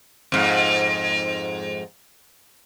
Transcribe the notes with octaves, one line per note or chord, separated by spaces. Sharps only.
F2 G#2